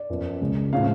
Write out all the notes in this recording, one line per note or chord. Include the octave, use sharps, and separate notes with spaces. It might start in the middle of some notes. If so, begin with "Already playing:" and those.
Already playing: D5
F#2 F3 B3
C#2 C#3 G#3
A2 F3 G#3 C#4 F5